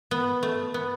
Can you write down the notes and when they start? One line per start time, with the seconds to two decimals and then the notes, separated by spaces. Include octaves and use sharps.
0.11 B3
0.43 A3
0.74 B3